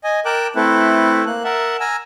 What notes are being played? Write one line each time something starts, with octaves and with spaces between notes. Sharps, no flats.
D#5 G#5
A#4 G5 A5 D6 F#6
A3 C4 E4 A4 B4
A#3 F#6
A#4 E5 F#5 A5
G#5 A#5 E6 F6